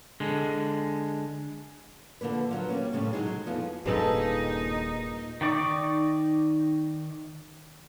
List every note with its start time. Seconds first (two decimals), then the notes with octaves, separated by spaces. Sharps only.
0.20 D3 G#3
2.21 D3 F3 A#3 B4
2.51 F3 F#3
2.69 G3 A#3 C#4
2.93 A2 C#3 G3 C4
3.13 F#3 G#3 D#4 G#4
3.46 F2 E3 F3 B3
3.86 D#1 G2 A#2 D#4 G#4 A4 B4
5.41 D#3 D#4 D5 C#6 D6